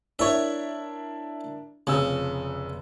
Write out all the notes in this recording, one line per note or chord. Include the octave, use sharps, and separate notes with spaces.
D4 E4 A#4 C#5 E5
F1 F2 C#3 E6